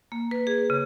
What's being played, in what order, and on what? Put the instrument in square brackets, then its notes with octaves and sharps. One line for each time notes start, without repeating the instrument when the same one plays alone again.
[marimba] A#3
B4
G#4
C#3